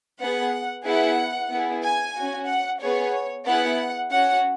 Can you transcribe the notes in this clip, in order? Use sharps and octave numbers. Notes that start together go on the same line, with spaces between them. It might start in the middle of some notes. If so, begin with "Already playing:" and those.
B3 G#4 F#5
B3 E4 G#4 F#5
B3 E4 G#4
G#5
C#4 F#4
F#5
B3 G#4 C#5
B3 E4 G#4 F#5
C#4 F#4 F#5